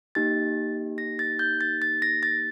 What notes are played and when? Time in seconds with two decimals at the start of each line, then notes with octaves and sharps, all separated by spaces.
0.15 A#3 D#4 G4 A6
0.98 A#6
1.19 A6
1.39 G6
1.61 A6
1.82 A6
2.02 A#6
2.23 A6